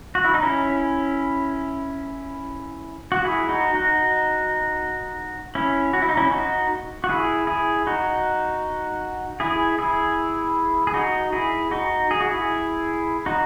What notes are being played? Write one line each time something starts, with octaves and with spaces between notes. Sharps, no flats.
F#4
E4
D#4
C#4 E4
F#4
E4 G#4
D#4 F#4
D#4 F#4
C#4 E4
F#4
E4
D#4
C#4 E4
D#4 F#4
F#4
E4 G#4
E4 G#4
D#4 F#4
E4 G#4
E4 G#4
G#4
D#4 F#4
E4 G#4
D#4 F#4
G#4
F#4
E4 G#4
D#4 F#4